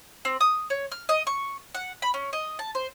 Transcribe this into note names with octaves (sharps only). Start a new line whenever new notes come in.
C4
D#6
C#5
F6
D#5
C#6
F#5
B5
C#4
D#5
A5
C5